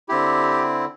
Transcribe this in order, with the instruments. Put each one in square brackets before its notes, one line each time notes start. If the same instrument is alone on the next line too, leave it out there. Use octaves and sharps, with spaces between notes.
[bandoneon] D3 C4 E4 G4